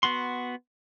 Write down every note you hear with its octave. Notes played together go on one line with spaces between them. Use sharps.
B3 F#4 C6